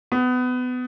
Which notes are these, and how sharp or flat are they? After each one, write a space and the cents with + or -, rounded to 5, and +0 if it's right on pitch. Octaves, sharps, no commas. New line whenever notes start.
B3 +25